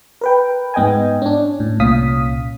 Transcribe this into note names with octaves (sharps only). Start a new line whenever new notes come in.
A#4 B4 G5
G#2 B3 D#5 G5 G#5
C#4 D4
A2
C2 A#2 C#4 F5 D#6 B6